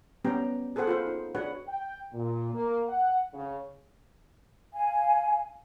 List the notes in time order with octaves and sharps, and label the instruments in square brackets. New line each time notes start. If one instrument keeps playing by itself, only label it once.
[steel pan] G3 B3 C#4 G4 G5 A#5
G#4 A4 B4 C5 F#5 G5
F4 B4 C5
D#4
D4 F#4 G#4 B4 C#5 F#5
[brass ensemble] G5
A#2
A#3
F#5
C#3
[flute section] F5 G#5